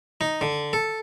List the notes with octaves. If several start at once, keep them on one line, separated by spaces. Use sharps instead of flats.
D#4
D3
A4